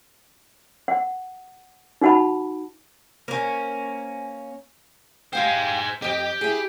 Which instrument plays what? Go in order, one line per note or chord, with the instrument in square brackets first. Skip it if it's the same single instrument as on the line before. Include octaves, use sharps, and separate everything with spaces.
[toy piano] F#5
D#4 F#4 F#5 A5 B5
[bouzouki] A#3 C#4 [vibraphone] C5 G#5
[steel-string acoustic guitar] G4 F5 G5 [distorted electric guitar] G#4 C5
[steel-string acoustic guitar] F2 D#5 [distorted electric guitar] G4 G5
[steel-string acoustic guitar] E4 G#4